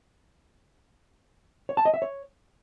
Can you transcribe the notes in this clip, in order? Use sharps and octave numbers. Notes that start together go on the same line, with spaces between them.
C#5
A5
D#5
E5
C#5